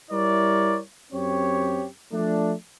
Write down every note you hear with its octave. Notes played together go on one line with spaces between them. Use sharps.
G3 E4 A#4 C#5 D5
F#2 C4 G4 C#5
F3 A3 D4